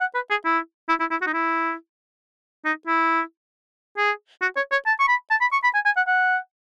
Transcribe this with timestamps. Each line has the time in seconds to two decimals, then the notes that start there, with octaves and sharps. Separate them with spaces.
0.01 F#5
0.15 B4
0.30 G#4
0.45 E4
0.89 E4
1.00 E4
1.11 E4
1.22 F#4
1.27 D#4
1.33 E4
2.65 D#4
2.87 E4
3.98 G#4
4.42 F#4
4.57 C#5
4.72 C#5
4.87 A5
4.99 C#6
5.08 B5
5.31 A5
5.41 B5
5.53 C#6
5.64 B5
5.74 G#5
5.85 G#5
5.97 F#5
6.07 F#5